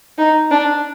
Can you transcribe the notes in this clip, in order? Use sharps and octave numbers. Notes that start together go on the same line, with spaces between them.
D#4
D4